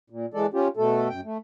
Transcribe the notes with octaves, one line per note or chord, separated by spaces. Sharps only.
A#2
E3 G#3 A4 D5
C#4 F4 G4
B2 A3 A4
F#2 G5
A3